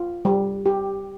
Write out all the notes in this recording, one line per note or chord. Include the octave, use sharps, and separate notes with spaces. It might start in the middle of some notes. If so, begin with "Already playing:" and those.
Already playing: F4
G3
G4